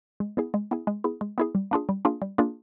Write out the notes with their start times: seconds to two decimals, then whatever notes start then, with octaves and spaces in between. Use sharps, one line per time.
0.20 G#3
0.37 B3 E4 G#4
0.54 G#3
0.71 B3 E4 G#4
0.87 G#3
1.04 B3 E4 G#4
1.21 G#3
1.38 B3 E4 G#4
1.55 G3
1.71 A#3 D4 F4 G#4
1.89 G3
2.05 A#3 D4 F4 G#4
2.22 G3
2.38 A#3 D4 F4 G#4